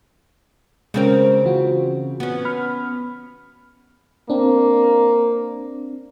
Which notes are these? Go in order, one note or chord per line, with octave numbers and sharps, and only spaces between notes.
C#3 G#3 C4 C#4 A#4
E3 F4 F#4
B3 C#4
B5 F6
A#3 C4 D4